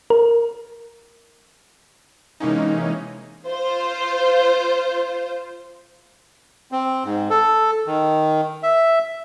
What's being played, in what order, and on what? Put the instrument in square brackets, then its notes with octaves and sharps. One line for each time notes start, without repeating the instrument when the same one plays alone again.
[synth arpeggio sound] A#4
[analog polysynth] C3 E3 G#3 A#3 C#4 D#4
[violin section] F4 C5
[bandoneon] C4
G#2
A4
D#3
E5